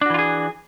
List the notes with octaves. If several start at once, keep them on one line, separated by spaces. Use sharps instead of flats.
E3 D4 F4 F#4 G#4